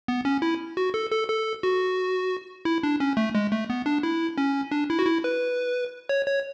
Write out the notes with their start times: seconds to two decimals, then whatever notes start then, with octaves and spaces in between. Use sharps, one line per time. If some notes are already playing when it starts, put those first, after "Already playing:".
0.08 B3
0.25 C#4
0.42 E4
0.77 F#4
0.94 A4
1.12 A4
1.29 A4
1.63 F#4
2.65 E4
2.83 D4
3.00 C#4
3.17 A3
3.35 G#3
3.52 A3
3.70 B3
3.86 D4
4.03 E4
4.38 C#4
4.71 D4
4.90 E4
4.99 F#4
5.06 E4
5.24 B4
6.09 C#5
6.27 C#5